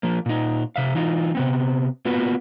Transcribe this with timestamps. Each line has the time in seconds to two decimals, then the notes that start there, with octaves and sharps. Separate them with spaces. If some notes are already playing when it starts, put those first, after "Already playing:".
0.03 F3 A#3
0.26 A#2 D#4
0.76 C3 E5 F5
0.95 E3 D#4 F4
1.35 C3 B3 C4
2.05 A#3 B3 F4 F#4 B4